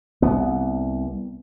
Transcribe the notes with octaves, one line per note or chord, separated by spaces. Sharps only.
C2 B3